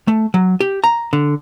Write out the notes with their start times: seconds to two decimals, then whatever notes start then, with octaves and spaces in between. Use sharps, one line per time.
0.08 A3
0.34 F#3
0.60 G4
0.84 A#5
1.13 D3